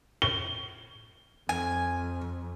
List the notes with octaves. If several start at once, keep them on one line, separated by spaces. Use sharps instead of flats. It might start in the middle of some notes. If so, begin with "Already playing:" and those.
G7
F2 G#5